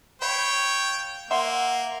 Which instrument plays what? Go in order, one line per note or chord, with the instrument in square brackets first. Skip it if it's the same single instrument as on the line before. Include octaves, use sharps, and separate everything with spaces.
[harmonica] C#5 G5 [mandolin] F5 B5
[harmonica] A#3 [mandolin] E5 F#5 C6